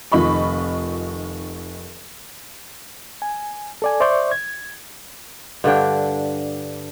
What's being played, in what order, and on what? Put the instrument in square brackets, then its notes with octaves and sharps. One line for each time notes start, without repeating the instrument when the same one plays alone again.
[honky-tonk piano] F1 D#3 F4 D#5 B5 C#6
[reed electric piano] G#5
A4 D5 G#5
C5 D5 E5 C6 C#6 G6
G#6
[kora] G2 D3 D4 G5